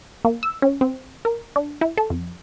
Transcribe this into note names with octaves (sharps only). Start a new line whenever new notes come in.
A#3
E6
C#4
C4
A#4
D4
E4
A4
F2